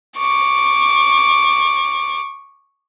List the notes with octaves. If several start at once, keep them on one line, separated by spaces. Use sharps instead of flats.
C#6 D6